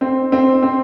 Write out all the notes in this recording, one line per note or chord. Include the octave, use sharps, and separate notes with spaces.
C4
C4
C4